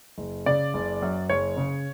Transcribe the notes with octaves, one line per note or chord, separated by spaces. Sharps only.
F#1
C#3 D5
F#1
F#2
F#1 C#5
C#3